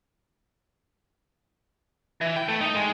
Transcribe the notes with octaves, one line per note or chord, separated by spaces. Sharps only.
E3
G5
A3
D#4
G#3